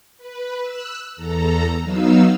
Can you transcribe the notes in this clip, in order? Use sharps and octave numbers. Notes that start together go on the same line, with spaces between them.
B4
E6 F#6
E2 A4 A#5
F#3 B3 D#4 F5 E6